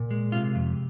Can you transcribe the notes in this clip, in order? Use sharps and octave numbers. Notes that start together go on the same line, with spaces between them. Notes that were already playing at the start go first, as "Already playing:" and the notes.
Already playing: A#2
G#3
C3 F4
F2